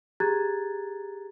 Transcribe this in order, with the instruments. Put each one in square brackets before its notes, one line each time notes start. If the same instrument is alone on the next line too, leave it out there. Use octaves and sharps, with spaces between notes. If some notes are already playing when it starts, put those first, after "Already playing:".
[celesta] G4 G#4 A#5 F#6 G#6 A6